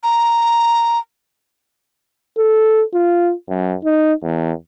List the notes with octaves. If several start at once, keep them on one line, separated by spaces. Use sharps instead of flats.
A#5
A4
F4
F#2
D#4
E2